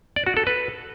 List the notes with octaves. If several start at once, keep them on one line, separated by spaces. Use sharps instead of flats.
D5
F#4
A4
B4